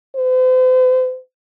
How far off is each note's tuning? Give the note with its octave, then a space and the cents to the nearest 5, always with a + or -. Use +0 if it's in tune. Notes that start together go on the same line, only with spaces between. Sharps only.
C5 -40